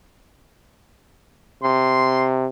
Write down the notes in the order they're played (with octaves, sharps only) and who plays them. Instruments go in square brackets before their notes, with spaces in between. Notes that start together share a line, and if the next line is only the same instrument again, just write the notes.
[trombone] C3 [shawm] C6